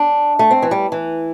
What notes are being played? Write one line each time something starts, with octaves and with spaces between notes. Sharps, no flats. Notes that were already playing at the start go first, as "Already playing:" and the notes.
Already playing: D4
A3
C4
E3
G3
E3